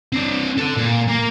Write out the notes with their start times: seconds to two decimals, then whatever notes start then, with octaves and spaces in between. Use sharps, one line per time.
0.13 C4 D4
0.58 A4 F#5
0.77 A#2
1.08 A#3